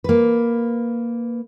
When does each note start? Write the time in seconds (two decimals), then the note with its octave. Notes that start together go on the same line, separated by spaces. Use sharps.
0.04 A#3 B4